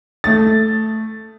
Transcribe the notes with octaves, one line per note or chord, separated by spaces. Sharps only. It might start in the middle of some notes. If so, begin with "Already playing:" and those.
A3 A6